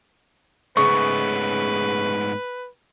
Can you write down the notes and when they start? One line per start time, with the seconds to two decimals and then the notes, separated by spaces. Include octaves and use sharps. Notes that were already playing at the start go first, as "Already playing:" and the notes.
0.77 G#2 C#3 A3 B3 B4 C#6